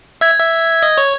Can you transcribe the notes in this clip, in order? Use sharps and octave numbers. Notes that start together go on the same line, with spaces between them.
E5 G#6
E5
D#5
C#5